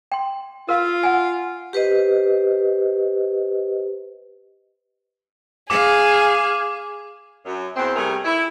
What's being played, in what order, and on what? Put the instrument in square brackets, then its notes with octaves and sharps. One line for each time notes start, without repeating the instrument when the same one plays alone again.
[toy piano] G5 C6
[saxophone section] F4 [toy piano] A#4 F5
[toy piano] F#5 G#5
[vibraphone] G4 B4 C5 D#5
[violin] G#4 [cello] F5 [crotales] D6
[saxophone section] F#2
E2 C4
C3 G3 A3 G#4 A#4
E4